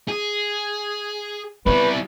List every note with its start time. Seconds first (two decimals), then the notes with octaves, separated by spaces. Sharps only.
0.08 G#4
1.66 G3 B3 C4 E4 B4